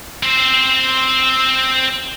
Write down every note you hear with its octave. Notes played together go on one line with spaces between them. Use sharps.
C4 C5